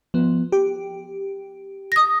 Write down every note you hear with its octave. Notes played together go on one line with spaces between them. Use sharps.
F3 B3
G4
D#6 A#6